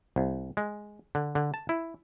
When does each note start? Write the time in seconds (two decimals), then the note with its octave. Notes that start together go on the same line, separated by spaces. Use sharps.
0.16 C2
0.57 G#3
1.15 D3
1.35 D3
1.54 A5
1.69 E4